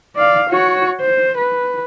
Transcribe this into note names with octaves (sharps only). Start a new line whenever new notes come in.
D5 F5
F#4 C#5
C5
B4